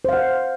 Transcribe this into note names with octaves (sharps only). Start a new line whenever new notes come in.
C5 F5 F#5